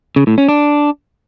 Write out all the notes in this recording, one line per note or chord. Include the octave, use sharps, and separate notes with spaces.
C#3
A2
C#4
D4